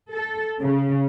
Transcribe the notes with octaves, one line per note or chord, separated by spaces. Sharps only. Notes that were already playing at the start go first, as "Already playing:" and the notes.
A4
C#3